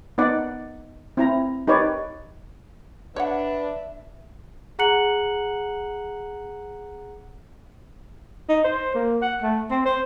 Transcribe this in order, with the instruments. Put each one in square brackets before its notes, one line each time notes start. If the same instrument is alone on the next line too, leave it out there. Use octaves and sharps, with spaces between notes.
[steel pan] B3 D#4 D5 F#5
C4 E4 A#5
D#4 G4 B4 C#5 D5
[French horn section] D4 [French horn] B4 [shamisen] C#5 D5 F#5 [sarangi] E5
[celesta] G#4 F#5 A#5 F#6 C#7 F#7
[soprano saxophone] D#4
C5
A#3
F#5
A3
C4
C5